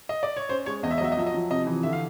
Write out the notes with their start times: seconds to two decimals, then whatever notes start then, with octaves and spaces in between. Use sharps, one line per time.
0.09 D#5
0.23 D5
0.37 C#5
0.49 C#4 C5
0.66 G#3 C#5
0.83 E2 D#5
0.91 E5
0.98 D#5
1.01 F#3 E5
1.12 D#5
1.17 F3 E5
1.27 D#5
1.34 F3
1.51 C3 D#5
1.67 E3
1.83 D3 E5
1.93 F5